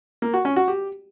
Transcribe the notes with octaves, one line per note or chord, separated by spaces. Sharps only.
A#3
F#4
C#4
F#4
G4